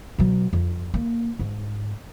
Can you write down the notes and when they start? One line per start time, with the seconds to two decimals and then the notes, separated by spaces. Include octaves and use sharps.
0.18 B2 F#3
0.53 F2
0.94 A#3
1.39 G#2